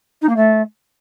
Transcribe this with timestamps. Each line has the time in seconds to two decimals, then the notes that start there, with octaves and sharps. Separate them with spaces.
0.22 D#4
0.29 A#3
0.36 A3